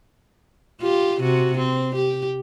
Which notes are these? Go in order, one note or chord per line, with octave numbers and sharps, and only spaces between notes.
F4 G4
C3 F#4
C4
G4